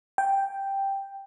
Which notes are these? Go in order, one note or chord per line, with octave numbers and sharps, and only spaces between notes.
G5